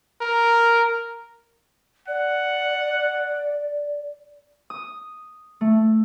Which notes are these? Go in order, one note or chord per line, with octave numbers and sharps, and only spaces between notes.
A#4
D5 F#5
D#6
A3